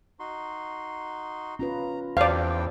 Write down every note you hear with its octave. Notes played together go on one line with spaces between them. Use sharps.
D#4 F#4 C6
C#4 F4 B4 A#5
E2 D4 F#4 A4 C5 D5 F5 G5